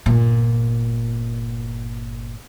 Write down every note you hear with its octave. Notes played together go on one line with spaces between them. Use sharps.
G1 A#2